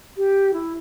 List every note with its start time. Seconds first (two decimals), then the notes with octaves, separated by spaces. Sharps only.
0.17 G4
0.54 E4